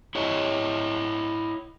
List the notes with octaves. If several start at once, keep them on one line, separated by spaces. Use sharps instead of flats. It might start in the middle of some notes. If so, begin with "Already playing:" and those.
E4 C#5 D#5